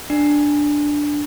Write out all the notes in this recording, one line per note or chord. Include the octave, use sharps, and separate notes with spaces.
D4